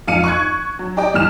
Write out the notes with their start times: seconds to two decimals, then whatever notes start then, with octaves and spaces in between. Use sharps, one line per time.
0.07 G#1 F2 F5 C#7 D#7
0.24 C#6 F#6 G#6
0.79 F#3
0.97 G4 D5 D#5 G5
1.14 G1 E2 F6 E7